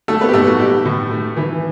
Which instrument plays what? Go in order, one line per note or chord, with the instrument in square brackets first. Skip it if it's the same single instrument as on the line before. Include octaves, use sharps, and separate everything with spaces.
[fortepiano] F#3 A3 A4
B3 B4
G4
A1 A3 A4
F#4
A1 G4
A2
A3
E3